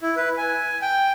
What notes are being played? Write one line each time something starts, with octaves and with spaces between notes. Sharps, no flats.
E4
B4
G#5
G5